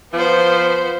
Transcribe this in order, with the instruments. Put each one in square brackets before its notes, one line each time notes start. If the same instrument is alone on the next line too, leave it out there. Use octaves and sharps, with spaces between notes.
[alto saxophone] F3 [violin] B3 C5